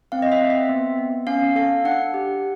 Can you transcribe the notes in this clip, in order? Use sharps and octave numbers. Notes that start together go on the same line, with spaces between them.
C4 F5
D#5
E5
C4
E5
B3
B3
C#4 F5
A4 F5
D4 F#5
G4